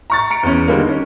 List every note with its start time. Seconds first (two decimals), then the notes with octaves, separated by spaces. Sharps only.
0.10 A#5 C#6 A6
0.31 A#5 C#7 D7
0.43 E2 C#4
0.68 D3 D#3 G3 G#3 A#3
0.89 C#4